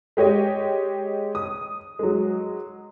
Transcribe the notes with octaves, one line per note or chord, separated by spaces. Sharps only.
G#3 G4 C#5 D#5
D#6
F#3 G#3